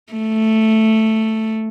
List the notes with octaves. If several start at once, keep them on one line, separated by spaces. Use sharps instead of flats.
A3